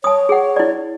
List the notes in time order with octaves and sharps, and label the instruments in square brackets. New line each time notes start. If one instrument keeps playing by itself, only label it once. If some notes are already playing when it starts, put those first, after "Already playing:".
[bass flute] C#5 [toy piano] A5 D#6
[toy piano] G#4 F#5
E4 D5